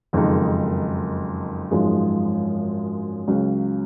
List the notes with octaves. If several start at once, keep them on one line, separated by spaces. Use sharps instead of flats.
F#1 F2 D#3 G#3 D#4
G#1 F#2 F3 G#3
C#2 C#3 F#3